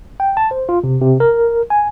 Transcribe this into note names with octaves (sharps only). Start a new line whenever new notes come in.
G5
A5
C5
F4
C3
C3
A#4
G#5